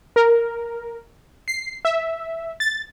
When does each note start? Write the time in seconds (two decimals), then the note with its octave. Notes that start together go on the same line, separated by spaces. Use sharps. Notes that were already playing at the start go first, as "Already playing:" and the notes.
0.16 A#4
1.48 C7
1.85 E5
2.60 A6